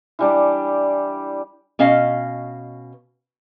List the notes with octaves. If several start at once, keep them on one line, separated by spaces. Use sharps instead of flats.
E3 G3 D4
B2 C#4 D#5 F5